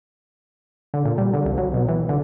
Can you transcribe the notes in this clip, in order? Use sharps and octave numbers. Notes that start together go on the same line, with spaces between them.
D3
A#2
G3
D3
C2
F#3
B2
E3
D3